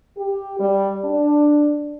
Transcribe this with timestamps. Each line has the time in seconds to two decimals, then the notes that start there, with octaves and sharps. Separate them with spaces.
0.17 G4
0.59 G3
1.04 D4